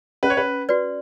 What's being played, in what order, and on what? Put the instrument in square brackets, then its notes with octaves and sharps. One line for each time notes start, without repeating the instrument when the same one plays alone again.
[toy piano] C#4 [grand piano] B4
[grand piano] C#5
B4
[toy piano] F#4 B4 D5